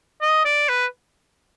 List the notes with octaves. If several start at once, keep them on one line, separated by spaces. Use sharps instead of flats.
D#5
D5
B4